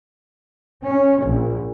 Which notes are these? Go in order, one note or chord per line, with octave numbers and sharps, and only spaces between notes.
C#4
A#1